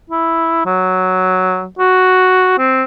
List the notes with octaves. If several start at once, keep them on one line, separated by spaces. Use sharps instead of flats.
E4
F#3
F#4
C4